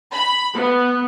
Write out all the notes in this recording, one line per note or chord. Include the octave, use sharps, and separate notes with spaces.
B5
B3